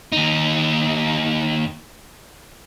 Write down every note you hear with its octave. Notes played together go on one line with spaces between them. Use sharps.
D#2 D#4